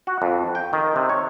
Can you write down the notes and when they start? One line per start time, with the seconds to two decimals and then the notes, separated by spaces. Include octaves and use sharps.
0.07 F#4
0.22 F2
0.55 G5
0.73 D#3
0.96 C3
1.09 C#5